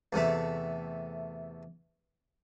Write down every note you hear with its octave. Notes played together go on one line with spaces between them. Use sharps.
E2 C3 A3 E5